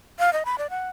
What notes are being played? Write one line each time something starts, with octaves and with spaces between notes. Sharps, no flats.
F5
D#5
B5
D5
F#5